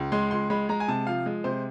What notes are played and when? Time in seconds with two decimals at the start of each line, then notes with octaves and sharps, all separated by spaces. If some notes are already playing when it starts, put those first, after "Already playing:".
Already playing: C#2
0.12 G#3 C6
0.31 C#2 C6
0.50 G#3 B5
0.69 G#3 A#5
0.80 G#5
0.88 C3 A5
1.07 F3 F5
1.26 G#3
1.44 C3 C5